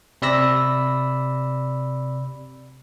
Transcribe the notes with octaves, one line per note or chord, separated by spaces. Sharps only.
C3 D5 B5 E6 A#6